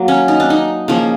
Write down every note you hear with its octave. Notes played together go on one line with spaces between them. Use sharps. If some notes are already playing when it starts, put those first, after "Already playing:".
Already playing: F#3 A#3
C#4
D#4
D4
D#4
C#3 F3 A#3